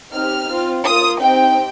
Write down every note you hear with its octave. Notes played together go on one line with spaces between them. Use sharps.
C4 D#4 G4 F6
C4 F4
A#3 F4 D#6
C4 D#4 G4 G5